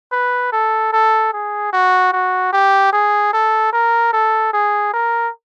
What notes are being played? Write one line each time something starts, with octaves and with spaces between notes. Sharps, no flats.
B4
A4
A4
G#4
F#4
F#4
G4
G#4
A4
A#4
A4
G#4
A#4